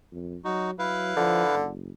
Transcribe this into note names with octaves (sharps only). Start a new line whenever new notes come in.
F2
F#3 D#4 F#4
F#3 E4 B4 F5
D3 F3
F#1